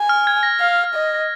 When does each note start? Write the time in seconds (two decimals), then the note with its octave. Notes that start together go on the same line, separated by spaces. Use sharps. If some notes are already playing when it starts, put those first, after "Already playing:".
Already playing: G#5
0.09 F6
0.27 G#6
0.43 A#6
0.60 F5
0.94 D#5